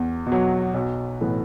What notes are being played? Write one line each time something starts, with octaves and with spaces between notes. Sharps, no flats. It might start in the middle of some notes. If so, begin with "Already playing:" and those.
Already playing: E2
B2
F#3
B1
A2 E3 B3